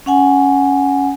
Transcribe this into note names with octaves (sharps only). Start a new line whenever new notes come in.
C#4 F#5 G#5